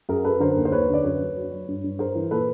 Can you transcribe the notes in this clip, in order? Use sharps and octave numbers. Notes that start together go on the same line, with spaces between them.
F#2 G#4 A#4
F#2 A4 B4
D3 A#4 C5
D#2
C5
D#2 B4 C#5
D3
D5
F#2 B4 C#5
F#3
F#3
F#3
G2
G2
G2 A#4 C5
E3
A#2 A4 B4